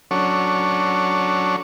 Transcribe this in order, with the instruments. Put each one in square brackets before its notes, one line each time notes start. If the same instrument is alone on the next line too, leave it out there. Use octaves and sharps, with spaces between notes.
[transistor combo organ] F#3 C#4 D4 A4 C#5